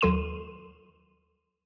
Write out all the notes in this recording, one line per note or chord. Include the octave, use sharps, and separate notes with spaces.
D#2 F#3 A4 C6 D#7 E7